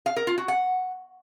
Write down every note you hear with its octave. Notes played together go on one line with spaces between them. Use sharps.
F5
A#4
F4
F#4
F#5